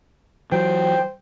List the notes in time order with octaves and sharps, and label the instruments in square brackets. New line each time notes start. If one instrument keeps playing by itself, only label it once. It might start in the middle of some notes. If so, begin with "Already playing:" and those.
[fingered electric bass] E3 F#3 [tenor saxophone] C5 [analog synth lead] G5